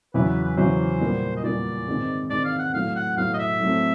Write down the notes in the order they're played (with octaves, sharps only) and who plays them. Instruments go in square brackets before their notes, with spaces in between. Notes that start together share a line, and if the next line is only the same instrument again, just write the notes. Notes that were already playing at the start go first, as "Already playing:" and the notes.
[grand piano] E2 C#3 F#3 B3 E4 [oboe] B4
[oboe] B4
B4
[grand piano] E2 C#3 F#3 B3 E4 [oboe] C5
[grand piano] A#2 G3 B3
[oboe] D#5
[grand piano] A#2 G3 B3 [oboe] D5
[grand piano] G#2 D#3 G#3 C4
[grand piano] G#2 D#3 G#3 C4 [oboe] D5
[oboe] F5
F#5
[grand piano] A2 F#3 B3 [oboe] F5
[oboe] F#5
[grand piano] A2 F#3 B3 [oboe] F5
[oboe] D#5
E5
[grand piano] A2 F#3 A3 C4